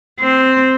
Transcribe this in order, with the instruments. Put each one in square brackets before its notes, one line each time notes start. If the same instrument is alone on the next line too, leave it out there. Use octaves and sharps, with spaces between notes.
[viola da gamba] C4